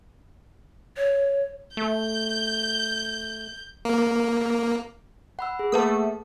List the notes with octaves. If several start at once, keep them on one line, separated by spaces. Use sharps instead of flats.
C#5
A3 G6
A#3
F#5 B5 E6
G#4
A3 A#3 B4 D#6